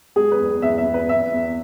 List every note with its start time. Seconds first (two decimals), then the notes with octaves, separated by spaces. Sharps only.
0.16 G#3 G#4
0.31 B4
0.39 E2
0.62 E2 E5
0.78 E5
0.86 E2
0.94 B4
1.09 E2 E5
1.33 E2